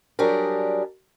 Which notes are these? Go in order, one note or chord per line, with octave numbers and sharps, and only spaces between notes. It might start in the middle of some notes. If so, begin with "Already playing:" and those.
F#3 G3 D4 G4 G#4 A#4